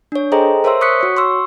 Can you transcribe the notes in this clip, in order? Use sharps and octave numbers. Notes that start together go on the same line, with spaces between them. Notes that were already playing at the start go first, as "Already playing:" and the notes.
D4 C#5
G#4 A4 C5 D#5 G5 A#5
A#4 C5 C#5 E5 C6 E6
C#6 D#6 F#6 B6 C#7
F#4 C#5
C6 C#6 E6